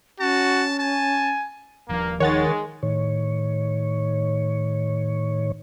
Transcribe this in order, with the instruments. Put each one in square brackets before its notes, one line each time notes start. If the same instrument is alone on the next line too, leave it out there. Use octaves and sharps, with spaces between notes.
[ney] C#4 [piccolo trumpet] F#4 [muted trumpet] A5
[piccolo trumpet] G#5 [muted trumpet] A5
[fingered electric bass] D#1 F3 [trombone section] G2 A#3
[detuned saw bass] D#3 [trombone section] G#3 [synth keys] C#5 F#5 A6
[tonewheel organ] A2 D#3 C#5